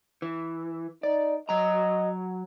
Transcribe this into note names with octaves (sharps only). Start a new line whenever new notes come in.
E3
D#4 D5
F#3 D#5 A#5